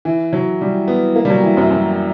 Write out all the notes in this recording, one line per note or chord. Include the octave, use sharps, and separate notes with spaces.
E3
F#3
G3
B3
A#3
G3
F#3
E3
F#2
F#2